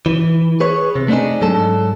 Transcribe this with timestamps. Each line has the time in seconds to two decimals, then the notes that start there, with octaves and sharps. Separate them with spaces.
0.06 E3
0.60 G#4 B4 C#5
0.95 C3
1.08 A3 C4 D4 D#4 G#4
1.41 G#2 F#3 A4 A5